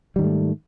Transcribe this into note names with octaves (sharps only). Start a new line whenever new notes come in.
G#2 D#3 G3 A3